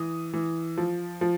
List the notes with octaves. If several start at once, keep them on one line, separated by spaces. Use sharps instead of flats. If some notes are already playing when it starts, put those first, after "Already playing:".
Already playing: E3 D#6
E3
F3
F3